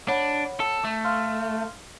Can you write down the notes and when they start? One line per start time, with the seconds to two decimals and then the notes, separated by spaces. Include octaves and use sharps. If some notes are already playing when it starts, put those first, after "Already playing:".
0.08 D4 C#5 F#5 B5
0.60 A4
0.84 A3
1.05 F5 C6 F6